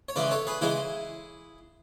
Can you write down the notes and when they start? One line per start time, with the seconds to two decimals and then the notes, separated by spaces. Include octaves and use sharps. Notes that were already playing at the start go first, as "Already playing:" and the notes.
0.09 C#5
0.16 C#3 E3 G#3 B4 D5
0.31 A4 C#5
0.47 G#4 B4
0.61 C#3 E3 G#3 E4 G#4